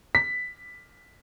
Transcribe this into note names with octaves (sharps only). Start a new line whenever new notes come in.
B6